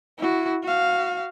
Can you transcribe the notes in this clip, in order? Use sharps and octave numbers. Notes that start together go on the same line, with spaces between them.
E4 F#4
F#4 F5